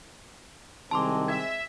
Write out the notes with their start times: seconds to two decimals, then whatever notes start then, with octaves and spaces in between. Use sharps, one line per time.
0.91 C2 D#3 G#3 C4 A5 C6 D6
1.28 E5 G#6